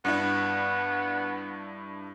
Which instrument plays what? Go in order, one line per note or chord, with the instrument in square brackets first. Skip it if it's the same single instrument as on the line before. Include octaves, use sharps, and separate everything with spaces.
[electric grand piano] G2 D4 E4 [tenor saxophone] B3